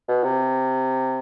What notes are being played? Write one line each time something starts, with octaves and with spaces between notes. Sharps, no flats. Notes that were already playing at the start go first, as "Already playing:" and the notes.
B2
C3